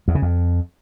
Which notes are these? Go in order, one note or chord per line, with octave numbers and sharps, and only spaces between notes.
E2
C#3
F2